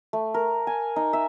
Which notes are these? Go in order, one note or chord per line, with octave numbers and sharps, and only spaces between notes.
A3
A#4
G#5
D#4
E5